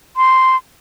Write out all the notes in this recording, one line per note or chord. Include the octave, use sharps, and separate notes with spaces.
C6